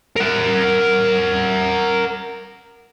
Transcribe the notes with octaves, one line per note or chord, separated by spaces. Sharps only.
A#4 F#5